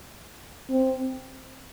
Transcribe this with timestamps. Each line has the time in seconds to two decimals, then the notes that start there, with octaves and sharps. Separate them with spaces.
0.70 C4